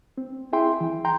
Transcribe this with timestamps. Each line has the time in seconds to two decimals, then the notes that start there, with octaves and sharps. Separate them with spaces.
0.18 C4
0.53 E4 G#4 E5 G5 C6
0.81 E3
1.05 G5 A#5 C6 G6